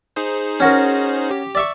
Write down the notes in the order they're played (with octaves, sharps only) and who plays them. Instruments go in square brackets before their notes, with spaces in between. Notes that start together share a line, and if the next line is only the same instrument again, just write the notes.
[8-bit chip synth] D#4 G#4 C5
[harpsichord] C#4 F#4 A#4
[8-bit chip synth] G4
[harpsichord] D5 E5 C#6